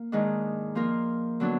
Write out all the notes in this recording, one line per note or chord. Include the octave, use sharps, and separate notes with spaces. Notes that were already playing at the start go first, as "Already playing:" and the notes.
Already playing: A#3
G#2 D#3 G#3 D4
F3 A#3 F4 A#4
D3 F#3 B3 D4